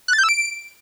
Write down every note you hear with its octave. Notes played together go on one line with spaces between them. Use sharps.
F#6
A6
G6
E6
D7